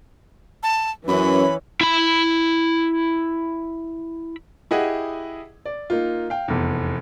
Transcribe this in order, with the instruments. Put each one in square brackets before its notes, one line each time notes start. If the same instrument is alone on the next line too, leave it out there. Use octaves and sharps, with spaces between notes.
[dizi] A5
[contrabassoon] F#2 [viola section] E3 C#4 [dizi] B5
[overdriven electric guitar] E4 B5
[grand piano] E4 G4 G#4 D#5 F#5
D5
A#3 D#4 F4
F5 G5
F1 E2